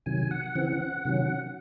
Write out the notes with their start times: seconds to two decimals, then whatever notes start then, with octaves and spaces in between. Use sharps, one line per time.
0.06 C3 D#3 F#3 G#5
0.31 F#5
0.55 C#3 E3 C4
1.05 C3 D#3 F#3 C#4